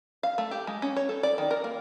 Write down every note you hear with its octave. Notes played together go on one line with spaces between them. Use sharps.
F5
A3
G4
G#3
C#4
C#5
A4
D5
D#3
A#4
A#3